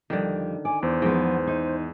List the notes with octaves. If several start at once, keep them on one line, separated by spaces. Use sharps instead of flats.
F2 D3 D#3 G3
D5 G#5
E2 C5
G#2 F3 B3 G5
D#4